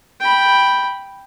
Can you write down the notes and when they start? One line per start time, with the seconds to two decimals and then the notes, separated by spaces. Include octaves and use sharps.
0.20 G5 B5